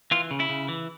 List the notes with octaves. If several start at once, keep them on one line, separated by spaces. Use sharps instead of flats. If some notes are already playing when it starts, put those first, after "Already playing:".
E3 F4
C#3
E4
C#3
E3